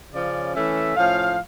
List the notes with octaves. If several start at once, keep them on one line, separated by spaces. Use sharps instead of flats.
C#3 F3 C#4 D5
E3 A3 C#4 E5
A2 F3 C#4 F5